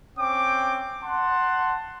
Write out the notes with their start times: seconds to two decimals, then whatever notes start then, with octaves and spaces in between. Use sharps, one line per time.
0.18 C4 C#4 G5 D6
1.03 F#5 A5 C6